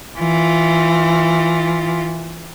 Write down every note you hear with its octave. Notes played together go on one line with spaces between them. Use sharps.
E3 F4